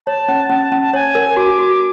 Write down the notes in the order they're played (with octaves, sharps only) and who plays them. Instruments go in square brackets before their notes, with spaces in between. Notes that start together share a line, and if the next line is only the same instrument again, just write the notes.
[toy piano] C#5 [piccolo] A5
[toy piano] C#4
[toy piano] C#4 [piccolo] A5
[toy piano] C#4
[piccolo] A5
[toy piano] C#5 [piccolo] G#5
[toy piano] A#4
[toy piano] F#4 [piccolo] D6
[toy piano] F#4